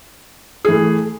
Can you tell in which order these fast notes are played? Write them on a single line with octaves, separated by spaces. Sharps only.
G#4 E3 A3